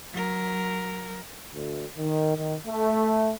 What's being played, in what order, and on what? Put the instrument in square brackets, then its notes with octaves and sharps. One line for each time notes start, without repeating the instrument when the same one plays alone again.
[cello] F#3 A#4
[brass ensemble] D2
D#3
D#3
A3